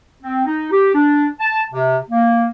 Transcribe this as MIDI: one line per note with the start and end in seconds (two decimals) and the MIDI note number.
0.22 0.45 60
0.46 0.69 63
0.72 0.91 67
0.95 1.28 62
1.40 1.61 81
1.72 1.98 48
2.11 2.48 58